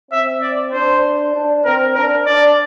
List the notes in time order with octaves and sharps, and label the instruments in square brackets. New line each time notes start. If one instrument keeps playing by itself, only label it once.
[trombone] C4 [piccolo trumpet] E5
[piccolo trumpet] D5
[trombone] D4 [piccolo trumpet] C5
[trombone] D4
[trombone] C4 [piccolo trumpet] A#4
[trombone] D4 [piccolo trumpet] A#4
[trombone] D4 [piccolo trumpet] D5